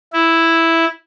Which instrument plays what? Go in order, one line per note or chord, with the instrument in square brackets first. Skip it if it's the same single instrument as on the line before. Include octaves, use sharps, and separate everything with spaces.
[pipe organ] E4